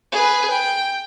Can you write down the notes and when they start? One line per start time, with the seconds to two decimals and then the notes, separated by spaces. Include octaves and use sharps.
0.12 G#4 B4
0.50 G5